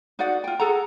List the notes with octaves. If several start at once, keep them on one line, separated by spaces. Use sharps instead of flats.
D#4 F#4 D5 F#5
F4 G5
G#4 A4 F#5 A#5